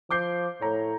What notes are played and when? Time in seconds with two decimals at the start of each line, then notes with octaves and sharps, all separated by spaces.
0.11 F3 D6 G6 C7
0.61 A2 C#5 A#5